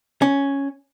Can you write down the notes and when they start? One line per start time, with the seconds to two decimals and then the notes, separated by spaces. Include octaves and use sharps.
0.22 C#4